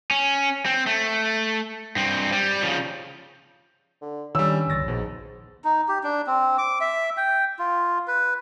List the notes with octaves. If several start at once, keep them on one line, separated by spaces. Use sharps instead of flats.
C#4
C4
A3
G2 C4
G3
C#3 F3
D3
D#3 E3 G3 C#4 D4 E6
G1 C#2 F#2 A6 A#6
A#1 G#2 B2
D#4
G4
D4
C4
D6
E5
G5
F4
B4